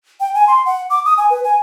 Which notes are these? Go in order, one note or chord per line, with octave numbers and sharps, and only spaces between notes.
G5
G#5
C6
F#5
D6
D#6
G#5
B4
G#5